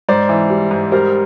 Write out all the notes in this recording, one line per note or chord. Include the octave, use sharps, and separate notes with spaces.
G#2 C5 D5
E3
G3
G#2
G3 A#4 C5